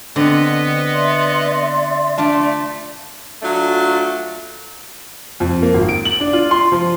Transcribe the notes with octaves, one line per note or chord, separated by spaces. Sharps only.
D3 B3 C4 B4 D#5
D5 E5 C6
A3 D4 F4 A5
F#3 A3 D4 F4
F2
A#3
G#1
D7
F#7
D4
F4
C6
F3